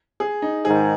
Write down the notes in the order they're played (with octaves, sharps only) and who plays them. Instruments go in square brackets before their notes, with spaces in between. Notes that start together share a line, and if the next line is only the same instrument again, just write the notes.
[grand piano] G#4
D#4
[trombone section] G#2 D#3 [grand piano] G#4